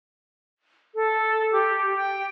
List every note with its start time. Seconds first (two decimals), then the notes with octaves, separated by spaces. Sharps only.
0.95 A4
1.52 G4
1.96 G5